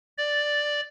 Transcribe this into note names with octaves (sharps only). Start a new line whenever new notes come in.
D5